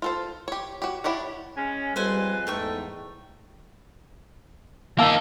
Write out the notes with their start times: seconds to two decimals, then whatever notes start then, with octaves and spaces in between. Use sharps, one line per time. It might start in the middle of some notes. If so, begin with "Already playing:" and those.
0.02 F4 A4 C5
0.48 G4 C#5
0.82 F#4 G4
1.04 D4 E4 G4 C#5 F#5
1.57 G#3 C#4
1.96 F2 G3 G#3 A4 B4 C5 G#5
2.47 E2 G#2 A3 D#4 G5 C#6
4.98 A#3 D#4 F5 A5 E6